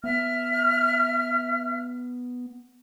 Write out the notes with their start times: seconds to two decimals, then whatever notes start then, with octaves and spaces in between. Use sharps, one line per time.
0.04 B3 E5 F6